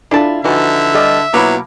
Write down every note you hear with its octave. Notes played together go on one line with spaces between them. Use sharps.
D4 E4 F4 A4 A5
D3 E3 F3 D#4 F#4 E5
G3 A4 D#5
B2 F3 F#3 A#3 B3 E4